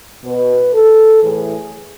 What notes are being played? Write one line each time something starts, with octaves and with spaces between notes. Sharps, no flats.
B2 B4
A4
A2 E3 G#4